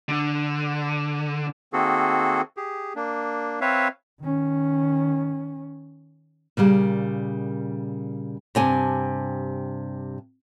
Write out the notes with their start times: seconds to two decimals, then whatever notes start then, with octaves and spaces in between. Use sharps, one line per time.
0.08 D3
1.73 D#3 A#3 C4 F#4 G#4 A4
2.57 G4 G#4
2.95 A#3 D4
3.61 C4 B4 C#5 E5 F5
4.20 D#3 C#4
6.57 A#2 C#3 G3 A#3
8.55 G2 C3 G#5 A5